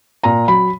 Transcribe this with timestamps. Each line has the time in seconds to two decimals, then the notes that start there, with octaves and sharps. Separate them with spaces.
0.23 A#2 A#5
0.48 F#3 B5